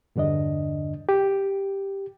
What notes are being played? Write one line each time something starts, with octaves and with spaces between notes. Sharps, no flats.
E2 G2 D3 D4 D#5
G4